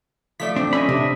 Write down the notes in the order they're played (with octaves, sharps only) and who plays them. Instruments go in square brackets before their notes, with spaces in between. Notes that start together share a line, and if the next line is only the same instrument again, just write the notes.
[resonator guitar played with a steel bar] F3 A3 D5 [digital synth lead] B6
[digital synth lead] C4 [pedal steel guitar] D4
[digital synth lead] C#4 [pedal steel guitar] D#5 E5 B5
[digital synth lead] C3 [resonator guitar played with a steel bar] D4